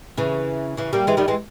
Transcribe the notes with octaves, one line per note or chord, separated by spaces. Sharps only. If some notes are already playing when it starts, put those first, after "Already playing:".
C#3 E3
C#3 E3
G3 A#3
E3 G#3
D#3 G3
E3 G#3